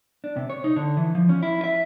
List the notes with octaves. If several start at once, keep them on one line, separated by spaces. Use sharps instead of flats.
D4
C3
C#5
D#4
D3
E3
F3
C#4
E4
E5